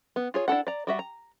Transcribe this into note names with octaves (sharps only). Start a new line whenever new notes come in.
B3
F4 G#4 C#5
D4 E4 A4 F#5
D5 A#5
G3 F#4 E5
A#5